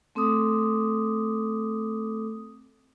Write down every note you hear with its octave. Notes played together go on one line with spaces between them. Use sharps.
A3 C4 A4 D6 D#6